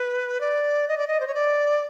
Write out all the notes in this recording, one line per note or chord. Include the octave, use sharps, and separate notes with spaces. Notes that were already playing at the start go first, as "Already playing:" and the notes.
Already playing: B4
D5
D#5
D5
D#5
C5
C#5
D5